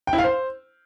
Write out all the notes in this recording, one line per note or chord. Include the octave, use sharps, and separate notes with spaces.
G5
E4
F5
C5